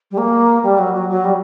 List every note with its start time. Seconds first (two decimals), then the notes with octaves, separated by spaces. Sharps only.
0.11 G3
0.18 A#3
0.63 G3
0.79 F#3
0.94 F#3
1.09 F#3
1.24 G3